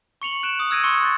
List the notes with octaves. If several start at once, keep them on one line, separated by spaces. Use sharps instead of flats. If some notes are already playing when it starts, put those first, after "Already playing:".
C#6 C#7 F7 F#7
F#6 D7 E7
D#6
E6 F#6 G#6 A#6 D7 D#7
C6 C#6 C#7
C6 F#6 A6